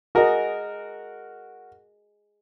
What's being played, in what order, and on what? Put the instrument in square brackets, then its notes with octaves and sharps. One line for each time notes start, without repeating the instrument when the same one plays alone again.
[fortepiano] F#4 A#4 [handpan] G#4 D#5